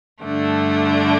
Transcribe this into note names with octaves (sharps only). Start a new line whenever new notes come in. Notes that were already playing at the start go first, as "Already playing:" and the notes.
G2 D3 A3 D4